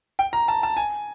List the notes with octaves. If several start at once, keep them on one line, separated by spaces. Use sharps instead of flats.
G5
A#5
A5
A5
G#5